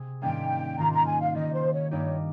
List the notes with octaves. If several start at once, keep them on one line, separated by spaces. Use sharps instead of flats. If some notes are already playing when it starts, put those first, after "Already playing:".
Already playing: C3 G#4
G#2 D#3 G3 A#3 C#4 G5
G#2 D#3 A#3 F4 A#5
A#5
G#5
F5
D#3 G3 A#3 D#5
C5
C#5
G2 G3 A#3 D#4 G4 C#5